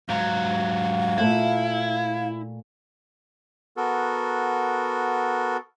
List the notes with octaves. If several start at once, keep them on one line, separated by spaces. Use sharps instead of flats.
G#2 F#3 F5
A#2 A3 E4 F#5
B3 F#4 A4 A#4